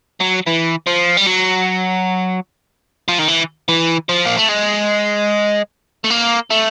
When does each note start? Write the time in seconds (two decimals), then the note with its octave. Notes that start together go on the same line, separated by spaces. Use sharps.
0.20 F#3
0.46 E3
0.87 F3
1.17 G3
1.27 F#3
3.08 F3
3.19 D#3
3.28 E3
3.68 E3
4.09 F3
4.26 A#3
4.38 A3
4.49 G#3
6.04 A3
6.10 A#3
6.51 A3